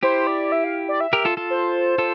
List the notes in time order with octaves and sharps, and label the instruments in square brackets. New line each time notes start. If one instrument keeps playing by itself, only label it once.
[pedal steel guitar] E4 G4 [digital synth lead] C5
[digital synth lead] D5
E5
F5
D5
E5
[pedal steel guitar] G4 A#4
F4 A4
F4 A4
[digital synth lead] C5
[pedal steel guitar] F4 A4